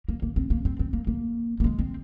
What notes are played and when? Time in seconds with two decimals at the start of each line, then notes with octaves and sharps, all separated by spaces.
0.08 A#3
0.22 A#3
0.36 C4
0.50 A#3
0.65 C4
0.79 C4
0.93 A#3
1.07 A#3
1.60 A#3
1.64 G#3
1.79 C4